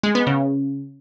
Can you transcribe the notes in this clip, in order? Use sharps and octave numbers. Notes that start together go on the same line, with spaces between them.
G#3
B3
C#3